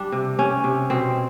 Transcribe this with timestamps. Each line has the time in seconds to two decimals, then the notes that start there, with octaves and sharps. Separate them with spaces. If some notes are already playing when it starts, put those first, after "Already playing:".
Already playing: G2 G3 D4
0.12 C3
0.39 C3 C#4
0.64 C3
0.90 B2 C4